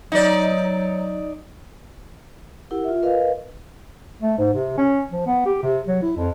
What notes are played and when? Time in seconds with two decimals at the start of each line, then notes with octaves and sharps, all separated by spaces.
0.12 F#3 D#4 D5
2.71 E4 G4 A#4 F#5
2.84 F4 E5
3.03 A#4 B4 D#5 F5
4.22 A3
4.38 G#2
4.54 C3
4.77 C#4
5.11 F3
5.26 B3
5.46 G4
5.63 C3
5.87 F#3
6.02 E4
6.17 F2